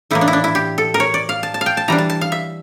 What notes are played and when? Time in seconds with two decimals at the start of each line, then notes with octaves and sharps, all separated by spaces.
0.11 A2 E3 A#3 E4
0.21 D4
0.28 E4
0.33 D4
0.44 E4
0.55 G4
0.78 A4
0.94 A#4
1.00 C#5
1.14 D5
1.29 F5
1.43 A5
1.54 A5
1.61 F5
1.66 G5
1.77 A5
1.88 E3 G3 D4 A#5
1.98 A5
2.10 A5
2.21 F5
2.32 E5